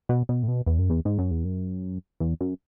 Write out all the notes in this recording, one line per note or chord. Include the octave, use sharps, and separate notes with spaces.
B2
B2
A2
B2
E2
F#2
E2
G#2
F#2
E2
F#2
E2
F#2